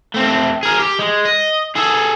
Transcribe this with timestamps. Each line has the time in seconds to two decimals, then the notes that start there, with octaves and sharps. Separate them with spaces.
0.15 A3 C4
0.63 G#4 A#4
0.79 G4
0.99 G#3
1.25 D#5
1.76 G#4 A4